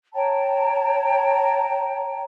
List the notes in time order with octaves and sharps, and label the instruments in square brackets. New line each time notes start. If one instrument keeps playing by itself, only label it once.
[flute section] C#5 G5 A5 A#5